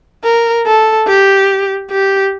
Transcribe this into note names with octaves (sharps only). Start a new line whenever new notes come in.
A#4
A4
G4
G4